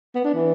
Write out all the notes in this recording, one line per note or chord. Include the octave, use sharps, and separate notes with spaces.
B3
D4
E3